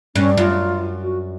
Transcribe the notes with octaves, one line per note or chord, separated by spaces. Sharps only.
G2 C#4
F#2 F4
F#4